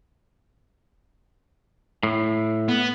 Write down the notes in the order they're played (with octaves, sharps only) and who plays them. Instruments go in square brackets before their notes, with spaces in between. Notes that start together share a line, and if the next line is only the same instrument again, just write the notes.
[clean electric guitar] A2
[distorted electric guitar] B3